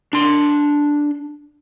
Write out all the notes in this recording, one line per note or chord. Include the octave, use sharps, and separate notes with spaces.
D4 C6